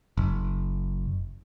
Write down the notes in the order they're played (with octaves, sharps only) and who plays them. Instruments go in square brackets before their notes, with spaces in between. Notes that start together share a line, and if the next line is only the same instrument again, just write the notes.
[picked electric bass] F#1